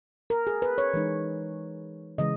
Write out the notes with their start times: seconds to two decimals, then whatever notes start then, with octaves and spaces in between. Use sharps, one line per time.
0.30 A#4
0.47 G#4
0.62 B4
0.78 C#5
0.94 E3 G#3 D#4
2.18 C#3 E3 G#3 D#5